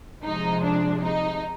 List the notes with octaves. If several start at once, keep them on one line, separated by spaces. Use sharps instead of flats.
C3 F3 G#3 D#4
D4
D#4